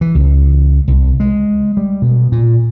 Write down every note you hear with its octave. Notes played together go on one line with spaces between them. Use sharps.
E3
C#2
C2
G#3
G3
B2
A#2